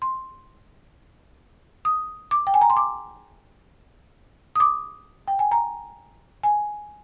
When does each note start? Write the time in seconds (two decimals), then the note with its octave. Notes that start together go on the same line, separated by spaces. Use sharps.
0.02 C6
1.85 D#6
2.31 D6
2.47 G5
2.54 G#5
2.61 A#5
2.70 C6
2.77 D6
4.56 D#6
4.60 D6
5.28 G5
5.39 G#5
5.52 A#5
6.43 G#5